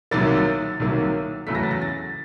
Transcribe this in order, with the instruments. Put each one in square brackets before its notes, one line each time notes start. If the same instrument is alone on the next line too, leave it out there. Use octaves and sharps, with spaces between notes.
[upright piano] C2 C3 D#3 F#3 A#3 A6
C2 C3 D#3 F#3 A#3
E2 C#3 F#3 A3 B6
A#6
A6
A#6
A6